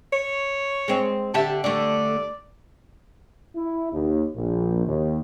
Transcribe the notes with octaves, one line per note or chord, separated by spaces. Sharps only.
C#5
G#3 C4
D3 G4 E5 A5
D3 A3 D5
E4
D#2
A#1
D#2